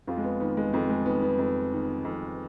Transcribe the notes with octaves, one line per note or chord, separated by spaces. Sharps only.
F2 F4
G#3
B3
D#3 B3
G#3
F2 G#3
G#3
D#3 B3
B3
F2
D#3
F2